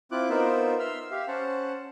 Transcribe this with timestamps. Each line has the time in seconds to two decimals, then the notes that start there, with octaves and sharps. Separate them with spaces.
0.12 C4 E4 F4 D6 F#6
0.30 B3 D#4 F4 A#4 C5 E5
0.79 E5 C6 E6 F6
1.11 G4 E5 F5
1.28 C#4 C5 F#5 A5